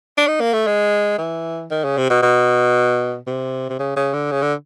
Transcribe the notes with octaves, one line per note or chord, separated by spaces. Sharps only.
D4
D#4
A#3
A3
G#3
E3
D#3
C#3
C3
B2
B2
C3
C3
C#3
C#3
D3
C#3
D3